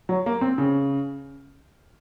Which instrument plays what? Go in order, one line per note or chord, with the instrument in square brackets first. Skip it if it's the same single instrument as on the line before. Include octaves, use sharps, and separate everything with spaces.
[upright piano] F#3
A#3
C4
C#3